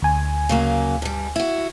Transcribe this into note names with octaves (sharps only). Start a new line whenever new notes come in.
D2 G#5
C#3 F#3 A#3
G2 G3
E4 F#4